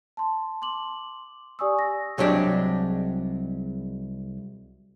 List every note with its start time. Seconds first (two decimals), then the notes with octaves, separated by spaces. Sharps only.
0.17 A5 C6
0.62 C6 D6 F#7
1.59 G4 D5 G#5 C#6 D#6 E6
1.79 A#6
2.18 C2 F#3 G#3 D4 G4